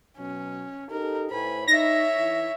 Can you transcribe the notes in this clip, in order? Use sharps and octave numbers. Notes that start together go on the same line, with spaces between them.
B2 F#3 C#4
D#4 G4 A4 A#4
A2 B4 C5 G#5 B5
D#4 C#5 E5 A#6
E3 E4